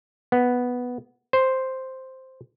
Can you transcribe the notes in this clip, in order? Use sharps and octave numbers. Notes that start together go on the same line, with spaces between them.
B3
C5